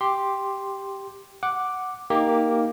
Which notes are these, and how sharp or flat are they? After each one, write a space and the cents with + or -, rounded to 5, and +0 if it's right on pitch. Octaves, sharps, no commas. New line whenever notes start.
G4 +0 C6 +0
F#5 +0 D6 +0
A#3 +0 D#4 +5 G4 +0